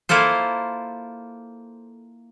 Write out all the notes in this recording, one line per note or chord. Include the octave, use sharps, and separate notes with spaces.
A#3 E4 F4 A4 C5